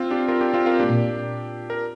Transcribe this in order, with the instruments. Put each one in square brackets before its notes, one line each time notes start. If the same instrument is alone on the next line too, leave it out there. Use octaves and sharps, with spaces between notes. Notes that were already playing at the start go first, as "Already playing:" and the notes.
Already playing: [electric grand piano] C4 F4
D4 G4
F4 A#4
D4 G4
C4 F4
F4 A#4
[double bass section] A#2 A#3 [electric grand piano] D4 G4
[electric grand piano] A#4